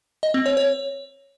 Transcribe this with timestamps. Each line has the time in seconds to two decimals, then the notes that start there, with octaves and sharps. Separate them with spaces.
0.23 D#5
0.34 C4
0.46 C#5
0.57 C#5